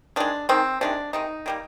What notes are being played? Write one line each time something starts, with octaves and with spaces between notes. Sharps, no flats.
D#3 G#3 D4
D#3 G#3 C4
C3 D#3 G#3 D4
C3 D#3 G#3 D#4
D#3 G3 A#3